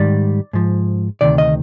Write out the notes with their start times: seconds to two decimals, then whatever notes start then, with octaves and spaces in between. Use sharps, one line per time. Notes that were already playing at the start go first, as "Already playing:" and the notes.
Already playing: G#2 D#3 G3 D5
0.53 G#2 F3
1.21 D2 C3 D#3 D5
1.38 D#5